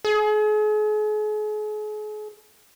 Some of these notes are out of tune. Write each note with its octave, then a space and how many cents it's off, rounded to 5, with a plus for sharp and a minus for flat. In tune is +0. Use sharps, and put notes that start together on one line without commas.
G#4 +40